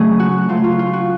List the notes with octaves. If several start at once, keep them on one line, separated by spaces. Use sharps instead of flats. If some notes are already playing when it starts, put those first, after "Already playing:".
Already playing: C#3 F#3 A3 G#4
F#4
C#3 F#3 A3 F4
F4
F4
F#4